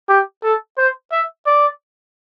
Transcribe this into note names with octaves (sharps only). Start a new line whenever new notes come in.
G4
A4
C5
E5
D5